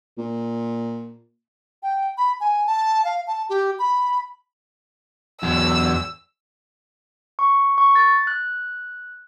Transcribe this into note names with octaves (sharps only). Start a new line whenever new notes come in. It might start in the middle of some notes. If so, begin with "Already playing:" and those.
A#2
G5
B5
G#5
A5
F5
A5
G4
B5
E2 F#3 E6
C#6
C#6
A6
F#6